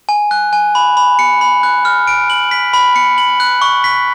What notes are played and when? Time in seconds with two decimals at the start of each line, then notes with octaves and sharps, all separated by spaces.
0.09 G#5
0.31 F#6
0.53 G#5
0.75 B5
0.97 B5
1.19 C#7
1.41 B5
1.63 F#6
1.85 F6
2.07 D7
2.30 F#7
2.51 B6
2.73 B5
2.96 C#7
3.18 F#7
3.40 F#6
3.62 C#6
3.84 B6